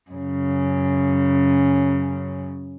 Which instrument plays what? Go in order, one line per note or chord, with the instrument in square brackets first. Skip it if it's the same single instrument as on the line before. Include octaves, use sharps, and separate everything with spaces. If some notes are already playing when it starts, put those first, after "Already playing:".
[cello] F#2 C#3